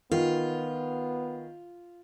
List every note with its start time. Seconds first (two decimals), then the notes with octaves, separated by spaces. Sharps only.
0.12 D#3 B3 F4